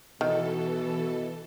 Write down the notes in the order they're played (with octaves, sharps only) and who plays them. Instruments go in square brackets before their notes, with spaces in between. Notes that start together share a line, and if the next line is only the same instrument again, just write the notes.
[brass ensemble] B2 [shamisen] D#3 [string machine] E3 A4